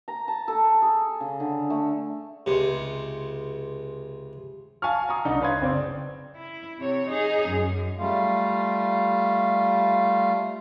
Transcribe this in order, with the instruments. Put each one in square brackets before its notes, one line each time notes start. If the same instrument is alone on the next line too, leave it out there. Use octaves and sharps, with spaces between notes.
[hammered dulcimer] A#5
A5
A4
G#4
C#3
D3
A3
[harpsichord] C#2 C3
[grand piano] F5 G#5 A5 C#6 F6
A#5 C#6 D#6
C2 D4 D#4
B4 C#5 F5 C6 G#6
F#1 C4 D5
[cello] E4
C3 C#5
D#4 G#4
F#2
[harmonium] G3 A3 F4 F5